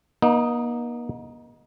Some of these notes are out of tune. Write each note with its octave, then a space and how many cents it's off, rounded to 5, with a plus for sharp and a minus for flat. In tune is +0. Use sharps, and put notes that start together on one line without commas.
A#3 +45 D#4 +0